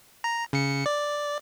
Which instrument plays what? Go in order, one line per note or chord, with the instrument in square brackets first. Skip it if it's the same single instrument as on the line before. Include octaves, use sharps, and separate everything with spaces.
[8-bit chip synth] A#5
C#3 C#7
D5